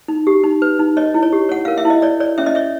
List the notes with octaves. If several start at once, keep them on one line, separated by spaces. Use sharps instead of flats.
D#4
G4
D#4
B4
D#4
C#5 D#5
E4
C#5
G4
C#5 F#5
A#4 F5
E5
E4
D#5
C#5 D5
C#5 D5
C#4 E5
D#5
C#5 E5